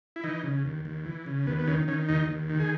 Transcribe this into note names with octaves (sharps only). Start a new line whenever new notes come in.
E4
E3 D#4
C#3
D#2
D#2
E3
C#3
D#2 B3
B3
D#3 C#4
D#3 C#4
D#2 D#4
D#2
D#3
G#4